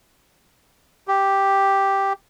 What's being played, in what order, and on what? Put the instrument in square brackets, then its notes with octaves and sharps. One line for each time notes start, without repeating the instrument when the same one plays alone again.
[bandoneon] G4